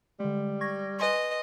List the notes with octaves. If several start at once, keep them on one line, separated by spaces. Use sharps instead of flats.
D3 G3 G#3
C#6 G#6 A#6
B4 D#5 G#5 C6